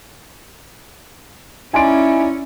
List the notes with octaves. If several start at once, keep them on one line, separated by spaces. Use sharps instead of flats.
C#4 D#4 E4 D5 G#5 C6 D7